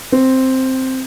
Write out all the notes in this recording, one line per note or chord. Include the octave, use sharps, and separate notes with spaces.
C4